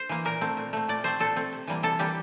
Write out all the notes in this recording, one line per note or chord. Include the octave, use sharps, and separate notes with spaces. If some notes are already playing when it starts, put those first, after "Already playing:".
Already playing: C5
E3 A#3
A#2 A#4
A3 C4
A#2
A3 C4
A#2 D5
A3 C4 C5
A#2 A4
A3 C4
C3
E3 G3 A#3
C3 A4
E3 G3 A#3 G4